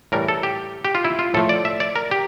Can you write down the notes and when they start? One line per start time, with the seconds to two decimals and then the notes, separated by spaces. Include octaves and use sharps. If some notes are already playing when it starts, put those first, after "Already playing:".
0.12 A2 E3 G3 A#4
0.28 A4
0.43 G4
0.85 G4
0.95 F4
1.05 E4
1.19 F4
1.34 A2 F3 A3 A4
1.49 D5
1.65 E5
1.80 D5
1.96 A#4
2.11 G4